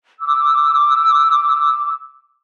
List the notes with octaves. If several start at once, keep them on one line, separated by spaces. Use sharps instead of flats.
D6 E6